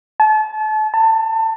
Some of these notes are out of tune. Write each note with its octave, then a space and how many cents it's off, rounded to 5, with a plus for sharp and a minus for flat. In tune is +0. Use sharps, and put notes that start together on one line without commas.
A5 -35
A5 +25